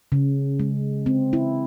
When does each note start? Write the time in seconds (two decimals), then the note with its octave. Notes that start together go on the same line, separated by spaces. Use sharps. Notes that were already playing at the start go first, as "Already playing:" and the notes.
0.12 C#3
0.60 G#3
1.06 C4
1.33 E4